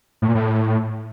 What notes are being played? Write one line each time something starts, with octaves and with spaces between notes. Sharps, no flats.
A2
A#2
A2